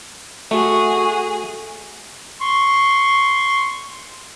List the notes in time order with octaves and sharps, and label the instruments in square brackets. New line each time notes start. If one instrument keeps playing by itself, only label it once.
[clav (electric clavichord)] A3 [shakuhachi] F#4 [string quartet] G#4
[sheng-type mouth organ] C6 C#6